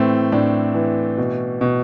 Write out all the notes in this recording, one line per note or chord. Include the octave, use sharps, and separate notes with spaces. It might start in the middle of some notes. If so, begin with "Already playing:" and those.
Already playing: A2 E3 A3 C4
A2 D4
E3
B2
B2